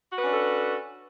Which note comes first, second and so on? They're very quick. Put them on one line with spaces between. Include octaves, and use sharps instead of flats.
F#4 B4 C#4 D4 A4